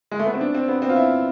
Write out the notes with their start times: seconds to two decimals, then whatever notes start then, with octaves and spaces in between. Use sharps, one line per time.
0.12 G#3
0.19 A3
0.26 B3
0.34 C4
0.41 D4
0.55 C4
0.68 B3
0.82 C4
0.89 F4
0.96 E4